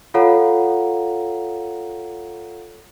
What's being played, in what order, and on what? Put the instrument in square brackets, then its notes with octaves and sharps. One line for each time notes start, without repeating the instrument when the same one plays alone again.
[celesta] F4 A4 C#5 F5 F#5 A#5